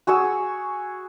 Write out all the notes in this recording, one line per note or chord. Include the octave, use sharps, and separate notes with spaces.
F#4 G#4 C#6 E6